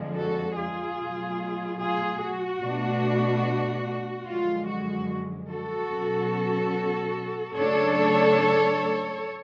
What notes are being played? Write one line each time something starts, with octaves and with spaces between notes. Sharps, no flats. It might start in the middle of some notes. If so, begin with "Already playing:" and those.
Already playing: F2 D3 F3 G#3
F#4 A4
F4 G#4
B2 F#3 A3
F4 G#4
F#4
B2 A3 D4
F#2 D3 F3 G#3 F4
F#4
F#4 A4
B2 F#3 C#4
C#3 F#3 A3 D4 A4 C#5